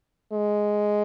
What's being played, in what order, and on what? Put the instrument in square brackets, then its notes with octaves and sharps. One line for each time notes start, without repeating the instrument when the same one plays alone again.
[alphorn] G#3